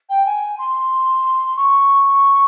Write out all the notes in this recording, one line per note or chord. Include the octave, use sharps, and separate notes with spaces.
G5
G#5
C6
C#6